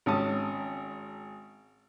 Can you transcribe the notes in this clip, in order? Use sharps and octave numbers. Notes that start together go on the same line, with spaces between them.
G#1 C#4 A5 D#6